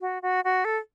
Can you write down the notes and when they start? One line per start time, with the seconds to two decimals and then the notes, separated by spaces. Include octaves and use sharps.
0.01 F#4
0.22 F#4
0.44 F#4
0.65 A4